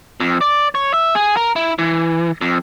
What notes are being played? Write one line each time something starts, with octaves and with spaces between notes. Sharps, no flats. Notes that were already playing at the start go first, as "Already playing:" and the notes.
F2
D5
C#5
E5
G#4
A#4
E4
E3
F2